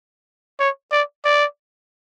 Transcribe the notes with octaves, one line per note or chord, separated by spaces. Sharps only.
C#5
D5
D5